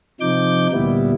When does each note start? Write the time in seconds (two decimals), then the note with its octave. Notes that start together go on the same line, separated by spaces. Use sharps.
0.21 C3 F3 D#4 D6 G6
0.73 D2 A#2 G3 B3 E4